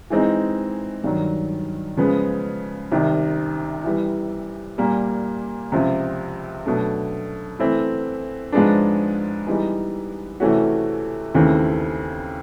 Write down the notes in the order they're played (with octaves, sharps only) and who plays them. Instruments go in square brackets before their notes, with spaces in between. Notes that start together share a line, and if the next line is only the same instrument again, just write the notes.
[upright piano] E3 G#3 C4 D#4
G2 D#3 F#3
C#3 F3 G#3 B3
C2 C3 D#3
E3 G3 B3
A#2 G3 A#3
C#2 C3 F3
B2 F#3 A3 D4
E3 A3 C4 E4
G#2 F3 G#3 B3 D4
E3 G3 B3 D#4 G#4
C3 E3 A3 C#4 F#4
D#2 C#3 E3 A3 C4